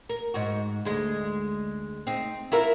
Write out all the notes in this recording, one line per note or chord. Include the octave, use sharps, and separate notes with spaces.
A#4
G#2 F#4
D2 G#3
C4 D#4
E4 F4 A#4